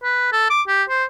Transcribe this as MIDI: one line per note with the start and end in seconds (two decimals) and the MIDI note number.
0.03 0.28 71
0.32 0.45 69
0.50 0.62 86
0.68 0.83 67
0.89 1.04 72